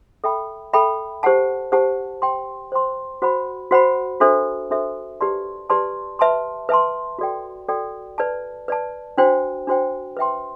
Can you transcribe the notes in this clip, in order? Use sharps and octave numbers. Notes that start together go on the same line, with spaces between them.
A4 E5 G5 B5
A4 E5 G5 B5
G4 C5 F#5 A5
G4 C5 F#5 A5
C5 G5 C6
C5 G5 C6
F#4 C5 F#5 B5
F#4 C5 F#5 B5
D4 F#4 A4 C5 E5
D4 F#4 A4 C5 E5
G4 B4 D5 A5 C6
G4 B4 D5 A5 C6
B4 E5 A5 C6
B4 E5 A5 C6
F#4 A4 D5 G5
F#4 A4 D5 G5
B4 D5 A5
B4 D5 A5
D4 F#4 C5 G5
D4 F#4 C5 G5
B4 E5 G5 C6